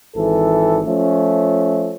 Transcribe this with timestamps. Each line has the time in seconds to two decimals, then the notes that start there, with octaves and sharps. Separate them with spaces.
0.16 G#1 E3 A4
0.87 F3 A3 C#4